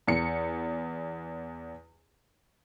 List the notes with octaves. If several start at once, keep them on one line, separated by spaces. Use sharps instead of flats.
E2 C#7